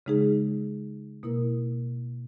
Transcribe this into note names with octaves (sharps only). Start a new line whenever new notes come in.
C#3 G#3 D#4 G#4
B2 A#3 E4 A#4